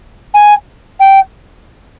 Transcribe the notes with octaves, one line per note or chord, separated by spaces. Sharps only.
G#5
G5